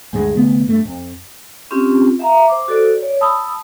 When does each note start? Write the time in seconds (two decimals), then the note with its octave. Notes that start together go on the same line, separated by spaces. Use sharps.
0.13 D2 G2 F#3 G#3
0.36 C2 D3 A3 B3
0.67 G2 A3
0.85 F2
1.71 C4 C#4 F4 G4
2.19 E5 F5 A#5
2.48 C5 D6
2.68 F#4 A4 C5 D5
3.01 C#5 D5
3.21 A5 B5 D#6 E6